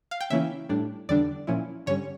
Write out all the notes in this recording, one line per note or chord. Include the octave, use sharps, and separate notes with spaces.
F5
G5
C#3 E3 A#3 C#4 E4 E5
A2 G3 D4
E2 D3 G3 D4 D5
A#2 F3 C#4 E4
G2 D3 G3 C#4 C#5